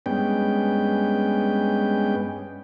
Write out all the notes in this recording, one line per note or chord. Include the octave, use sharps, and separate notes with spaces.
G2 G#3 B3 C#4 G5